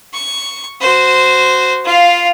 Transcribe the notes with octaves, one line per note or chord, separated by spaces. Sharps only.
C#6
F#4 C5
F4 F5